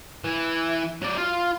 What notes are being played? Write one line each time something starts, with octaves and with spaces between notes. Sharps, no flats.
E3
F#3 D5
F4 F5